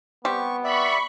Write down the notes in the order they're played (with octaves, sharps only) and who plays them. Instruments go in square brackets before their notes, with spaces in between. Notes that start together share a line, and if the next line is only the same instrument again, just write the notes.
[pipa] G3 C4 G4 [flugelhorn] B3 [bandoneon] C#6
[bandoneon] D5 E5 [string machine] B5 C#6